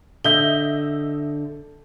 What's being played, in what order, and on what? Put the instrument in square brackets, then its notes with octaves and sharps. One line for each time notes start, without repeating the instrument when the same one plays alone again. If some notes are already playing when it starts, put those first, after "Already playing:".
[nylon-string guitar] D3 [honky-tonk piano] D#5 E5 G6 [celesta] G7